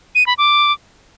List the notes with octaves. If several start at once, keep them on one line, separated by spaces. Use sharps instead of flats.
D#7
B5
D6